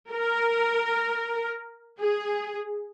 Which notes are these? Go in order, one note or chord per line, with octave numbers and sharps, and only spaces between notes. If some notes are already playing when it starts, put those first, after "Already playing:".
A#4
G#4